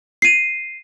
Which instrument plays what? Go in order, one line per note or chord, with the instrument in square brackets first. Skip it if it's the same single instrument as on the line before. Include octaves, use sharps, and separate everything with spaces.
[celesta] C7 D#7